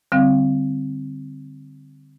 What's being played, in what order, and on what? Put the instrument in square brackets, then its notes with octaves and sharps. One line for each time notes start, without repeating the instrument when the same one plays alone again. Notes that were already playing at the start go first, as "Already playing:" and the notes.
[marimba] D3 G3 C4 F5